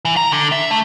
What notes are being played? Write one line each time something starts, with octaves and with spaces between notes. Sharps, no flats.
E3
A#5
D3
E5
A3